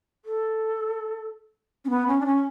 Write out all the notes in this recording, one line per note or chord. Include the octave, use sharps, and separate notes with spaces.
A4
C#4
B3
C#4
D4
C#4